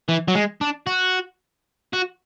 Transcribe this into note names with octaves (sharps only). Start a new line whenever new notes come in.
E3
F#3
G#3
D4
F#4
F#4